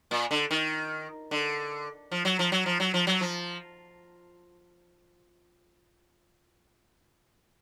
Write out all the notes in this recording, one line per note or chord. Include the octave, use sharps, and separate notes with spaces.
A#2
D3
D#3
D3
F3
F#3
F3
F#3
F3
F#3
F3
F#3
F3